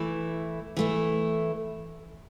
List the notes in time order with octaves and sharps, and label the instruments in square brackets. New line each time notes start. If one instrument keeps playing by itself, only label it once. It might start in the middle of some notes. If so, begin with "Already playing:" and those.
Already playing: [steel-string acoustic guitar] E3 A3 E4
E3 A3 E4